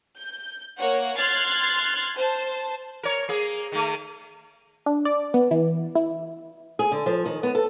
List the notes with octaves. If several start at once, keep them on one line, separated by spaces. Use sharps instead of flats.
G6
A#3 C#5 F#5
C6 F6 F#6 G#6 A6 C7
C5 A5
A#4 C#5
A#3 G#4
D#3 A3
D4
D5
B3
E3
E4
G#4
D3
F3
D#3
B3
A4